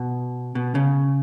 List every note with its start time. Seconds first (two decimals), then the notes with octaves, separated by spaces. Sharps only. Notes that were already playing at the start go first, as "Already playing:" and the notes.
Already playing: B2
0.55 B2
0.75 C#3